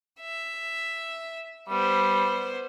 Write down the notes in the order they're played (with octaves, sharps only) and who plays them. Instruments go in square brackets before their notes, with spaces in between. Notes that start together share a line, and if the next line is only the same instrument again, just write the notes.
[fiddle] E5
[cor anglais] G3 [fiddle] B3 C5